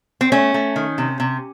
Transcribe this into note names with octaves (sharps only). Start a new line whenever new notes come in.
C4
A3 C#4
A3
D#3
C3
C3